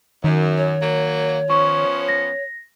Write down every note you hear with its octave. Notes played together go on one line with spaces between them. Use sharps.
F#2 D#3
C#5
F#3 A#3
F3 B3 C#4 C#6
A#6